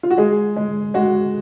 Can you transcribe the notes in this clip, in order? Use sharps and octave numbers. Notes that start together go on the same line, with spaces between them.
F4
F#4
G#3 G#4
G#3
G#3 F#4